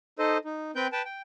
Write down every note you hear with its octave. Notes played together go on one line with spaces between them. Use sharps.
D#4 A4 C5 D#5
D#4
C4 B4 G5 G6
B4 G5 A5
G5